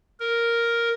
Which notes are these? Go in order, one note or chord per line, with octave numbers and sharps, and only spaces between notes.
A#4